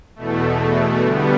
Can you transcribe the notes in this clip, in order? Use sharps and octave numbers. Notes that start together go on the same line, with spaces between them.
E2 B2 A3
D3 G3 B3